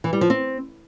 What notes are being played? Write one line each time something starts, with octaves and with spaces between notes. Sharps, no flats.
E3
G3
F3
C4